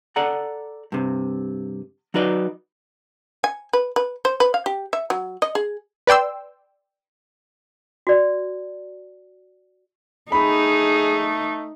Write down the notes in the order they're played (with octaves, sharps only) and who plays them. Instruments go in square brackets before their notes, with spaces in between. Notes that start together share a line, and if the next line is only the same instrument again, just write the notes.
[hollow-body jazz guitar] A4 D5 F#5 A#5
G2 C3
F#3 D#4 F#4 B4 D5 D#5
[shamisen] G#5
B4
B4
C5
B4
F5
G4
E5
F#3
D#5
G#4
[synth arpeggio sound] B4 D5 G5 C6 E6
[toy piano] F#4 D5
[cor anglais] A3 [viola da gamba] D#4 [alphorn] G#4 [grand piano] B5